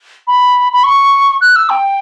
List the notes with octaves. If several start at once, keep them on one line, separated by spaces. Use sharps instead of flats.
B5
B5
C#6
F#6
E6
G5